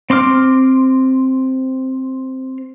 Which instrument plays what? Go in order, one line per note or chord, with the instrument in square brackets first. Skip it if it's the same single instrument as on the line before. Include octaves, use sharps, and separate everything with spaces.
[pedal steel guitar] C4 C6 D6 F6